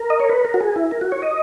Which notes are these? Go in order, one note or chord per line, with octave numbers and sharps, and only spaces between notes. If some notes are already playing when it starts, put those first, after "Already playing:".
Already playing: A#4
D#5
C#5
B4
A#4
F#4
G#4
E4
A#4
F#4
C#5
D#5